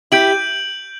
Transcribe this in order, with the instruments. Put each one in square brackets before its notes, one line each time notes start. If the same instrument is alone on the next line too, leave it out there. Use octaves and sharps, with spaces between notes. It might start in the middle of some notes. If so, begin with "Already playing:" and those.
[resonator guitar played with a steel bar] E4 G4 [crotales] G6 D7 F#7